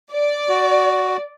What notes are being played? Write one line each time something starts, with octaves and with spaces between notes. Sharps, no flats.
D5
F#4